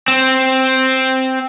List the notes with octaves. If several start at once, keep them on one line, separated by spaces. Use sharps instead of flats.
C4